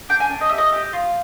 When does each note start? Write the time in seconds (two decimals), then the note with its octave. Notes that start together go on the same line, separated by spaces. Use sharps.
0.09 D4 G5
0.20 G#5
0.30 D4
0.41 D#5
0.49 G4 E5
0.58 D#5
0.72 G4
0.93 F4